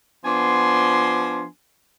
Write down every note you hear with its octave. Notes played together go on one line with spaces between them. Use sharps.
F3 B3 D4 G#5 C6